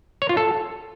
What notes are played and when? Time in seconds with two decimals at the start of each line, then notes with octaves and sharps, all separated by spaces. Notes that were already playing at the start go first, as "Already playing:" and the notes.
0.22 C#5
0.29 F4
0.37 A4